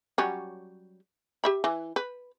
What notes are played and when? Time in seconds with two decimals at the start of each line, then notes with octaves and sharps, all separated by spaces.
0.18 F#3 G3 C#4
1.44 G4 E5 B5
1.64 E3
1.96 B4